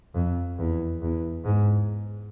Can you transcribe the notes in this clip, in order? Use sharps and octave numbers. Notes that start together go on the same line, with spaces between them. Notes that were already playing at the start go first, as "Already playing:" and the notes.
F2
E2
E2
G#2